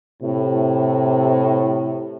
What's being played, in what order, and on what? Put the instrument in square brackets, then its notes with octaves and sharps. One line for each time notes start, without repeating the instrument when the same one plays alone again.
[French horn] A2 [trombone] C3